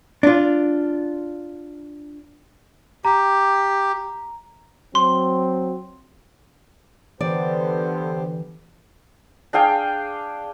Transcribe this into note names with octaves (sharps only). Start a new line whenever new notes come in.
D4 F4
G4 A#5
F#3 C4 C6
D3 E3 B3 G4 C5 D5
D4 G#4 F5 G5